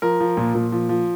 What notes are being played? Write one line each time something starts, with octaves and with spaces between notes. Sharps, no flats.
F3 A#4
F3
A#2
A#2
F3
F3